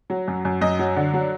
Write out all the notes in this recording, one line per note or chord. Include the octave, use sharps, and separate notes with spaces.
F#3
F#2
F#2
F#2 D#5
F#3
D3
F#3